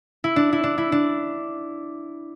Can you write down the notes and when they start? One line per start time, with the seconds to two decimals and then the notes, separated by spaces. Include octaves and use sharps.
0.24 E4
0.36 D4
0.53 E4
0.64 D4
0.78 E4
0.92 D4